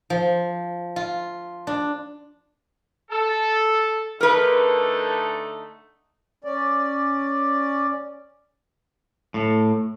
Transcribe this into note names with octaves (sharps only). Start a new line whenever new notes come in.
F3
F4
D4
A4
D3 A3 D#4 A#4 B4
C#4 D5
A2